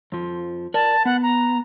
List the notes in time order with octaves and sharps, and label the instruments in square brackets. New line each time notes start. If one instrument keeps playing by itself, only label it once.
[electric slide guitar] F2 F3
[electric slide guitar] A#4 D5 [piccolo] A5
[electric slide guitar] B3 [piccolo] F#5
[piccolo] A#5